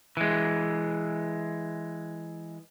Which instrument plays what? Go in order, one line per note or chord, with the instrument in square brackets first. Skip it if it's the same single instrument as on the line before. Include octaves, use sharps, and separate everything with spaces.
[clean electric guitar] E3 G#3